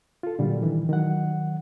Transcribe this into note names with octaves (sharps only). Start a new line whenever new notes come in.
F4 A4
A#2 D3 F#3 G3
D#3 E3
D#3 F#3 F#5